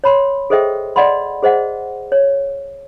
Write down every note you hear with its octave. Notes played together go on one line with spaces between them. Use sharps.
C#5 B5 C6
G#4 A4 C5 D#5 E5 G5
D5 D#5 F#5 B5 C6
G#4 C5 D#5 F#5
C#5